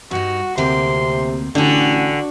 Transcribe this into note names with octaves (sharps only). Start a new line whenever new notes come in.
G2 D#4 F#4
D2 C3 A#3 C4 C6
A1 D3 F#4 G5 G#5